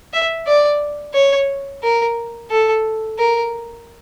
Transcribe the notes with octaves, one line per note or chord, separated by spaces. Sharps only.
E5
D5
C#5
A#4
A4
A#4